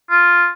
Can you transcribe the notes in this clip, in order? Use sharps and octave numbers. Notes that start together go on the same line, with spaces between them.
F4